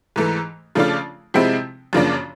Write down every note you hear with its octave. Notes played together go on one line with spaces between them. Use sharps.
G#2 E3 A3
C#3 F3 A3 D4 F4
C3 F3 G#3 C4 E4
F#2 C#3 F3 A#3 D4